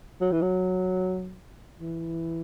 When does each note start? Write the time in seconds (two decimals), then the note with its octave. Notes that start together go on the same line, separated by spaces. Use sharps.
0.21 F#3
0.32 E3
0.42 F#3
1.80 E3